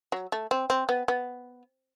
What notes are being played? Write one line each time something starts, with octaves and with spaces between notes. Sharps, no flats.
F#3
A3
C4
C4
B3
B3